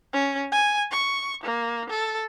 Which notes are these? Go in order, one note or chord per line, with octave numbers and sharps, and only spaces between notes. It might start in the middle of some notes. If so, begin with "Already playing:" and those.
C#4
G#5
C#6
A#3
A4